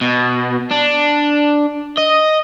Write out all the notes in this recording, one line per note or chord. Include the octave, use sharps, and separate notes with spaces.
B2
D4
D#5